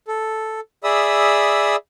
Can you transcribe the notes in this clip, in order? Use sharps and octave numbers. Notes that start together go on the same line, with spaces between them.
A4
G#4 D5 E5 B5 D#6 E6